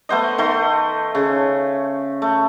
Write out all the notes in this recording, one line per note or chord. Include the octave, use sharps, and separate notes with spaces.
A3 B3 C5 D#5
D#3 A3 C6
C#3
A3